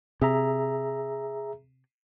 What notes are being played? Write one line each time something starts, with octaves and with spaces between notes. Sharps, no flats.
C3 G#4 E5 A#5